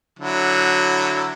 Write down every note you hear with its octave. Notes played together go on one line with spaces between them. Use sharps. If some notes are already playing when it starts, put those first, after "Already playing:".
D3 F#3 E4